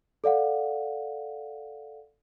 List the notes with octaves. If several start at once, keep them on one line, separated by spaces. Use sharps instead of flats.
A4 D5 F5 F#5